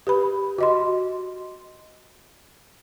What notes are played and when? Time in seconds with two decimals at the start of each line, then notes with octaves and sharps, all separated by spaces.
0.07 G4 B4 B5
0.58 F#4 D#5 C6